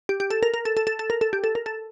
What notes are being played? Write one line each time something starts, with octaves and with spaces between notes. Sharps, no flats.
G4
G4
A4
A#4
A#4
A4
A4
A4
A4
A#4
A4
G4
A4
A#4
A4